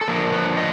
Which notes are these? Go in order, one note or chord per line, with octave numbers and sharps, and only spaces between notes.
A4
D3 F3 A#3 D4 A#4
B4
D#5